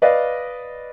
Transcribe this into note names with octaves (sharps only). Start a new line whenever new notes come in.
B4 D5 D#5 F5